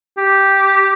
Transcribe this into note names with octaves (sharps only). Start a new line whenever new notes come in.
G4